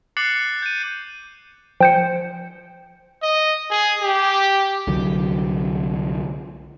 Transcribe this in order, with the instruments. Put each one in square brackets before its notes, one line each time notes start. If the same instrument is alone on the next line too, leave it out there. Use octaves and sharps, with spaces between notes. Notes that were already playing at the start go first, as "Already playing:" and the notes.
[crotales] D6 F#6 A6 C7 C#7 F#7
G6 D#7
[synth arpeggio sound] F3 C5 C#7 [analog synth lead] G5
[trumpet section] D#5
G#4
G4
[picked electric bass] C2 D3 F#3